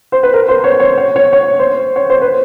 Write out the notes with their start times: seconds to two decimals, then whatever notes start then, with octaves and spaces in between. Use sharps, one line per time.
0.12 C5
0.23 B4
0.34 A#4
0.48 C5
0.64 C#5
0.80 C#5
0.98 C#5
1.16 C#5
1.33 C#5
1.59 C5
1.96 C#5
2.10 C5
2.22 B4